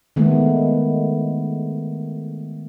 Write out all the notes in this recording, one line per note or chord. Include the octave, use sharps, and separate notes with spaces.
D#3 G#3 A3 B3